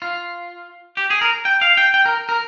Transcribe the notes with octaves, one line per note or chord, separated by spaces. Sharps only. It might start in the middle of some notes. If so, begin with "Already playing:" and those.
F4
G4
G#4
A#4
G5
F5
G5
G5
A#4
A#4